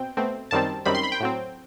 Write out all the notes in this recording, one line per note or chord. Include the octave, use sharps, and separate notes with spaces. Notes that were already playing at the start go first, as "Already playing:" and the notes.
Already playing: B2 C4 G5
B2 A3 C4
F#2 D#3 G3 C4 A5
F#2 D#3 G3 C4 B5
C6
B5
G5
A2 F#3 C4